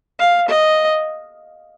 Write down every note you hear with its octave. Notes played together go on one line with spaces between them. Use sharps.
F5
D#5